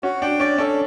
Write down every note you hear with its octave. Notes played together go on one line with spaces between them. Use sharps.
C#4 F#4
D4 G5
C#4 D5
C#4 A4